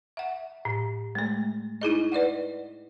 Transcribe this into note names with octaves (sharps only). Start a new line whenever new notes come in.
E5 F#5
A2
G#3 A3
D#4 E4 G#4 D#5
B4 D5 D#5 F#5